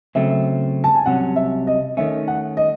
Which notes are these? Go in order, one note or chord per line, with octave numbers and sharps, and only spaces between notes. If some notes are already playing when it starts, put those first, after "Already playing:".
C#3 F#3 A3 C4 E5
A5
G#5
C2 C3 F#3 C#4 F#5
E5
D#5
D#3 A3 C#4 E5
F#5
D#5